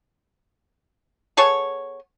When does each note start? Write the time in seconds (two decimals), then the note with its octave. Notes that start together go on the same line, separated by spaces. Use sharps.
1.37 B3 G#4 A4 C#5